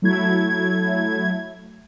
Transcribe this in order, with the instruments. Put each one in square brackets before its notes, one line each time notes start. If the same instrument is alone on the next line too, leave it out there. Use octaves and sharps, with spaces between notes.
[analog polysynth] F#3 A3 E4 G#6